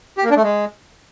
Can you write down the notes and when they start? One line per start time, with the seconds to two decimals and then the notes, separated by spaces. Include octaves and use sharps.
0.18 G4
0.24 A#3
0.30 D4
0.37 A3
0.43 G#3